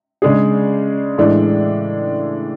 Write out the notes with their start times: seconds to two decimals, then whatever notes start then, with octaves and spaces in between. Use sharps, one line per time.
0.22 C#3 G#3 D4 G#4
1.18 A2 E3 G#3 D4